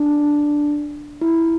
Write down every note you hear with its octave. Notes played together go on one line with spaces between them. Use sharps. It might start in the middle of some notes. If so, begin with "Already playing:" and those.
Already playing: D4
E4